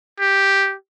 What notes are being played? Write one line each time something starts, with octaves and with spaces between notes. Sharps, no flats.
G4